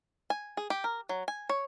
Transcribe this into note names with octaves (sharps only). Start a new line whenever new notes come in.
G#5
G#4
G4
A#4
F#3
G#5
C#5